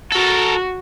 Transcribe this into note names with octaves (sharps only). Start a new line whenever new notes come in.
F#4 A4 A#4